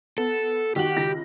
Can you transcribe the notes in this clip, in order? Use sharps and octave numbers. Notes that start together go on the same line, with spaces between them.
B3 A4
D#3 F#4 G4 F#7
C#2 D#3 A#6